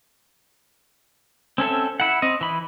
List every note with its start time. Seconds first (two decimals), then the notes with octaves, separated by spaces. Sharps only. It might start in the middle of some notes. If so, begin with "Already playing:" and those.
1.58 C4 C#4 A4 E5
2.00 E4 F#5
2.22 C4 D#5
2.41 E3 B5